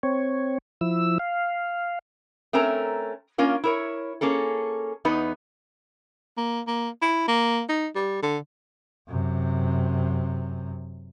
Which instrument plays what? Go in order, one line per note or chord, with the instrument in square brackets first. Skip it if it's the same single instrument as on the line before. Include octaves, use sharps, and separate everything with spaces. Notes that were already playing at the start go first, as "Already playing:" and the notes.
[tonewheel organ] C4 C#5
F3 E4 E6
F5
[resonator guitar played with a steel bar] A3 C4 C#4 A#4 A#5
A#3 C#4 F4 A#4
E4 A#4 C#5
A#3 C#4 G#4 A4
E2 B3 D#4 B4
[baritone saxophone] A#3
A#3
E4
A#3
D#4
G3
D3
[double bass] F#2 C3